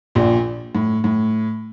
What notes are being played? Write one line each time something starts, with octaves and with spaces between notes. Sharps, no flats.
A#1 A#2
A2
A2